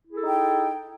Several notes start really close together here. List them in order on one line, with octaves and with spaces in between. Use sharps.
E4 G#4 A4 D#4 G5